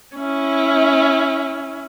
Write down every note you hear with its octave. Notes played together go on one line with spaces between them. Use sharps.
C#4 E4